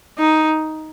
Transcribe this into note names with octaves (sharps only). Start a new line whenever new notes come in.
D#4